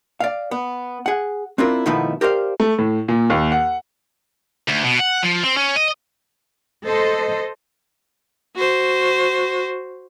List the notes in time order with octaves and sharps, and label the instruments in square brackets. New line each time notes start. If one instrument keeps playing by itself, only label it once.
[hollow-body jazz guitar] D5 F5
B3
G#4 F#5
C4 D4 E4 F4 A#4
B2 D#3 F3 A3 B3 E4
G4 A#4 C5 D5 E5 F5
[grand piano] A3
A2
A#2
D#2
F#5
[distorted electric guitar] D2
B2
F#5
F3
C4
C#4
D#5
[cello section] A4 C5 D#5
[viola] F#4 C5